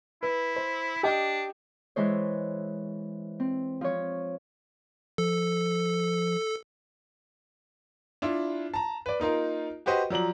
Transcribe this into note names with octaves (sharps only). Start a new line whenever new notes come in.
E4 B4
C5
D4 G4 D#5 G5
E3 G#3 C5 C#5
C4
F3 C#5
F3 A4
D4 E4 F4
A5 A#5
B4 D5
A#3 D#4 F4 A#4
F#4 G4 B4 C5 D#5
F3 F#3 D5 A#5 F#7